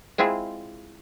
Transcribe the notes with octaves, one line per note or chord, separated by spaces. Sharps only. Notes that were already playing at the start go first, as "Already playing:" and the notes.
G#3 C4 E4 F4 G#4